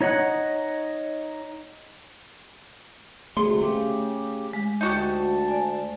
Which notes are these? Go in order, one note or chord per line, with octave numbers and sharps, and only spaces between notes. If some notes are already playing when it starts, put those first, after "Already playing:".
D#4 C#5 D#5 F#5
D2 C3 A3 G#4 C6
C#3 A3 G4
G#3
D2 D#4 F#4 G4 A5
D5 G#5